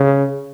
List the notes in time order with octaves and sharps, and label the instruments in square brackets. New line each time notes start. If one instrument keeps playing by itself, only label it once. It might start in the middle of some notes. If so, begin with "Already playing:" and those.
Already playing: [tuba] C#3